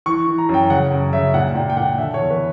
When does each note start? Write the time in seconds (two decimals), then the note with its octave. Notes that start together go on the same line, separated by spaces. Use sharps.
0.06 E3 C#6
0.27 E3
0.38 A#5
0.49 F#2
0.54 G5
0.70 C#3 F#5
0.91 F#2
1.13 C#3 E5
1.34 A#2 F#5
1.55 A#2 G5
1.70 G5
1.77 A#2 F#5
1.98 D3 E5
2.14 C#5
2.19 E2
2.30 B4